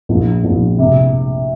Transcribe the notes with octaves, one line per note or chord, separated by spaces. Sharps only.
A#1
A#1
C3